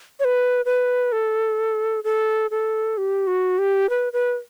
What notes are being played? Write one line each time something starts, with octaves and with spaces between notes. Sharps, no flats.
C#5
B4
B4
A4
A4
A4
G4
F#4
G4
B4
B4